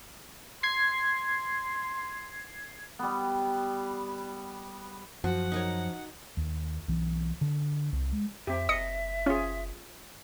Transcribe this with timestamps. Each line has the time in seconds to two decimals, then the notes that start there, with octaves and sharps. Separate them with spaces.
0.63 C6 G#6 C7
2.99 G3 B3
5.24 F#2 F3 F#4 F#5
5.52 D#4 A#4 C#5
6.37 D#2
6.88 B1 E3
7.41 D3
7.92 C2
8.13 G#3
8.47 F2 C4 G4 E5
8.69 F#1 D#5 D#6 C#7
9.26 C#4 F4 G#4